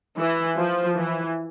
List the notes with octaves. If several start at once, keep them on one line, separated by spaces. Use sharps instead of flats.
E3
F3
E3